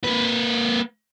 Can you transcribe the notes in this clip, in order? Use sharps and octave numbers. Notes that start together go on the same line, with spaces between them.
A#3 B4